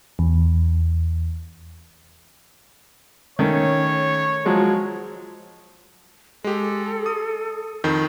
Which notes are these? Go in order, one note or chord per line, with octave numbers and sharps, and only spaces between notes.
E2
D#3 A3 C#4 C#5
F3 F#3 G#3
G#3 G4 A4
D#6
F2 D#3 G6